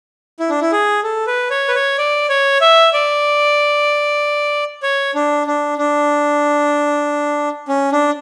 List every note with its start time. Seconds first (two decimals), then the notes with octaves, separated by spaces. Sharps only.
0.40 E4
0.50 D4
0.61 E4
0.72 G#4
1.03 A4
1.27 B4
1.50 C#5
1.68 B4
1.75 C#5
1.98 D5
2.29 C#5
2.61 E5
2.93 D5
4.83 C#5
5.15 D4
5.47 D4
5.78 D4
7.68 C#4
7.92 D4